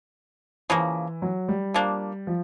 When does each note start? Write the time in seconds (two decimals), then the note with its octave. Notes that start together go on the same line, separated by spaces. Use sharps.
0.70 C#3 E3 F3 A#3
1.22 F#3
1.48 G3
1.74 F3 A#3 D4
2.27 F3